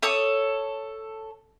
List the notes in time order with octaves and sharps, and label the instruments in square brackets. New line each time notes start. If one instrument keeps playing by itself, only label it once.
[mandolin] A4 C#5 D#6